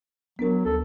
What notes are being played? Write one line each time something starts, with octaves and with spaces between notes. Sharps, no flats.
F#3 B3 D4 A#4
D2 A4